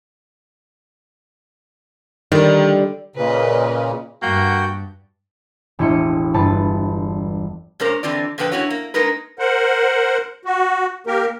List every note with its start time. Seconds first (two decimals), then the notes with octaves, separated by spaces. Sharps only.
2.32 D3 D#3 G3
3.16 A#2 C#3 B4 D#5
4.22 G2 A#3 F#4 F#5 G5 G6
5.79 E1 A1 E4 D#5 C#7
6.34 G1 B4 A5
7.80 A#2 G#3 C#4 A#4 C5
8.03 D3 E3 C4 F4 D5
8.38 A#2 D3 F3 B4 G5
8.52 F#2 C#4 E4 F#4 C#5
8.70 A#3
8.94 G#3 A#3 D#4 A#4 B4
9.39 A#4 C5 F#5
10.45 F#4
11.07 A#3 G4 A#4